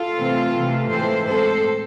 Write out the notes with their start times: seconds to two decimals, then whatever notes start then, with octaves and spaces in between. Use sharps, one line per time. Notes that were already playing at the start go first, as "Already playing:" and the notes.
Already playing: F4 A4
0.18 C3 E3 A3 C4
0.54 C3 E3 A3
0.90 A2 E3 G#3 C4 A4 C5
1.26 A2 G#3 C4 A4 C5